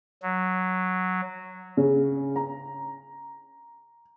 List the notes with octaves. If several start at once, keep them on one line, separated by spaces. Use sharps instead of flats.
F#3
C#3
A#5